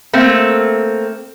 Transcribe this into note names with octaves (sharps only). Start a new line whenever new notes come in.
A3 A#3 C4